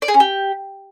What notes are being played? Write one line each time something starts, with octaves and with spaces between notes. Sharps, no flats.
D5
G#4
C#4
G4